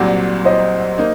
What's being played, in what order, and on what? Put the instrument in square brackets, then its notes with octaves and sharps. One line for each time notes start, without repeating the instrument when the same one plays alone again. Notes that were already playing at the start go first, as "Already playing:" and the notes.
Already playing: [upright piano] C2 A#2 F#3 C4 [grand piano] D5 F#5
[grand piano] C5 D#5
[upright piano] A#3 D#4